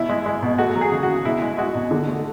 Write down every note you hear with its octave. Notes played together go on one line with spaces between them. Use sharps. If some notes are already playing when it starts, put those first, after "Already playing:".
Already playing: B2 E4
G#3
G#3
B2
A3 F#4
F#3
G#4
C#3
F#4
C#3
B2 E4
G#3
G#3 F#4
B2
D3
A3